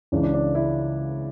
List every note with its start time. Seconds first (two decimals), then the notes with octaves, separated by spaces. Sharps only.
0.12 C#2 C#3 E3 D4
0.23 D4
0.34 D4
0.55 E4